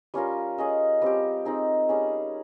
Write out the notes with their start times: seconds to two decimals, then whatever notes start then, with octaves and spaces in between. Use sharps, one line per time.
0.14 G3 C#4 F4 A#4
0.58 C#4 G#4 D#5
1.02 G3 C4 G4
1.45 C4 D#4 G#4
1.89 G3 C#4 G#4